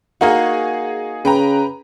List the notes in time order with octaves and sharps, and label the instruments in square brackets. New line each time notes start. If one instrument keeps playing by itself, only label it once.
[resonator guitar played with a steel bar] A#3 F#4 [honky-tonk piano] D#4 G#4
[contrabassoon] C#3 [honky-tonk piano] B4 G5 A#5